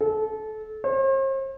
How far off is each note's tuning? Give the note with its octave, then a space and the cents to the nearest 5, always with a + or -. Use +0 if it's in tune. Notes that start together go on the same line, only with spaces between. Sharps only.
A4 -25
C5 +45